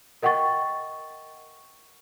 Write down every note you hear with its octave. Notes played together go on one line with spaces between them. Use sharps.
A#4 D#5 F#5 G5 C#6 A6